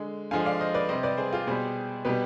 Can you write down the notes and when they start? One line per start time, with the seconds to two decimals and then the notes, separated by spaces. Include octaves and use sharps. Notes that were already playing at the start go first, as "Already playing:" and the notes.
Already playing: D3 G#3
0.31 D3 F3 G#3 F5 G#5
0.45 D5 F5
0.60 C5 D#5
0.74 B4 D5
0.89 C3 G3 C5 D#5
1.03 B4 D5
1.18 G#4 C5
1.33 F4 G#4
1.47 B2 G3 G#4 C5
2.05 B2 G3 G4 B4